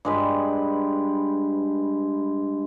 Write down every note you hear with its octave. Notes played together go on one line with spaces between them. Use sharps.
G2 G#3 B4